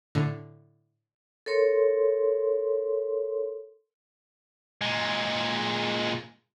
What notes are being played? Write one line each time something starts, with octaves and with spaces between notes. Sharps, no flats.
A2 D3
A4 A#4 C#5 C6
A#2 G#3